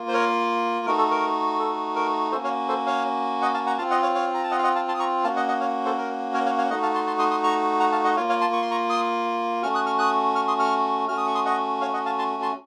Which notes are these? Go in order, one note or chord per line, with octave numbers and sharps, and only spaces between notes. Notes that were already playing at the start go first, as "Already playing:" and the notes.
Already playing: A#3 F4
C5
A#4 C#5
A3 D#4 F#4 A#4
A4
A#4
A4
A#4
A#3 C#4 F#4 A4 C5
C#5 F5
A4 C5
C#5 F5
D#5 F#5
F5 A5
F#5 A#5
C4 F4 F5 A5
D#5 F#5
C#5 F5
C#5 F5
A#5
A5
D#5 F#5
F5
D#5 F#5
F5 A5
A5 C6
D#6
A#5 C#6
A#3 C#4 F#4 F5 A5
D#5 F#5
D#5 F#5
C#5 F5
A4 C5
A#4
A#4 C#5
C#5 F5
C#5 F5
A3 D#4 F#4 D#5 F#5
F5 A5
A5 C6
A5 C6
C6 D#6
C6 D#6
A#5 C#6
F#5 A#5
F5 A5
D#5 F#5
A#3 F4 C#5 F5
C#5 F5
A5 C6
C#6
C6
A#5 C#6
C6 D#6
A3 C#4 F#4 C#6 F6
D#6 F#6
C#6 F6
D#6 F#6
C#6 F6
C6 D#6
C#6 F6
A3 C#4 F#4 F6
D#6
C#6
C6 D#6
D#5 F#5
C#5 F5
D#5 F#5
F5 A5
A5 C6
A5 C6